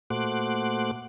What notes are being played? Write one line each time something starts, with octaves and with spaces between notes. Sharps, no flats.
A#2 A3 F#4 C5 D6 F#6